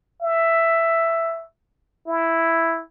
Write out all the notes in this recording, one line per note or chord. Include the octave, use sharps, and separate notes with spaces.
E5
E4